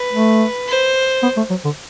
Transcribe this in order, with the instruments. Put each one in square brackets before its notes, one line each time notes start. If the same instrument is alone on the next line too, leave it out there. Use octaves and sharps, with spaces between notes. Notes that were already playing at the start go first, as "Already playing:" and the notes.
Already playing: [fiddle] B4
[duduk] A3
[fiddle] C5
[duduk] B3
A3
F#3
D3